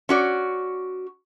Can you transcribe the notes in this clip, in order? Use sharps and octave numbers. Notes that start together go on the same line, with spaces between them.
C#4 F#4 D5